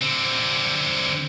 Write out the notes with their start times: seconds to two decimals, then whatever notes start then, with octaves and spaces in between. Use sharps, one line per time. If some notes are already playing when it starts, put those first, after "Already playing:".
0.02 D3 C4